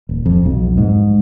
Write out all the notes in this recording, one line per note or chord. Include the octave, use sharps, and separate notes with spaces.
D#1
F2
B1
G#2